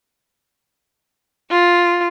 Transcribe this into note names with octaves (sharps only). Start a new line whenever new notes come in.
F4